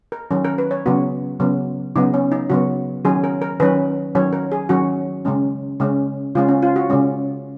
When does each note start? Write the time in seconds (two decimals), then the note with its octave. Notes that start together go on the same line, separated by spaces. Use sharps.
0.12 A#4
0.31 D#3 F#3 C#4
0.45 A#4
0.58 B4
0.71 C#5
0.86 C#3 F#3 B3 F#4
1.40 C#3 F#3 B3
1.96 C#3 F#3 B3 D#4
2.14 C#4
2.32 D#4
2.50 C#3 F#3 B3 F#4
3.05 D#3 F#3 C#4 G#4
3.24 A#4
3.42 A#4
3.60 D#3 F#3 C#4 B4
4.15 D#3 F#3 C#4 C#5
4.33 A#4
4.52 G#4
4.69 D#3 F#3 C#4 F#4
5.25 C#3 G#3 C#4
5.80 C#3 G#3 C#4
6.35 C#3 G#3 C#4 F4
6.49 C#4
6.63 F4
6.76 F#4
6.90 C#3 G#3 C#4